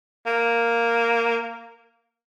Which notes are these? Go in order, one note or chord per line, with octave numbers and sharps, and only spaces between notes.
A#3